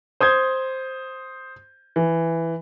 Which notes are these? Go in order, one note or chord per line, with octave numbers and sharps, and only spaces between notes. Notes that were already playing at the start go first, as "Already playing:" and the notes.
C5 D#6 G6 G#6
E3